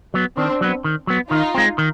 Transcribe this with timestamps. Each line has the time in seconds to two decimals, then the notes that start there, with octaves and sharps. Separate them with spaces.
0.14 F#3 B3
0.37 D#3 C4 D4
0.61 F#3 B3
0.84 D#3
1.07 F#3 B3
1.31 D#3 D#4 F4
1.55 G#3 C4
1.78 D#3